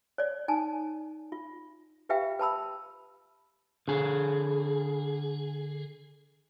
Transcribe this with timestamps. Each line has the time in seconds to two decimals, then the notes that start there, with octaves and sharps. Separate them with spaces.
0.18 C#5 D5
0.48 D#4 G#5 A5
1.32 F4
2.09 F4 G4 B4 E5 F5 G5
2.39 B4 A5 B5 E6
3.88 D3 G#4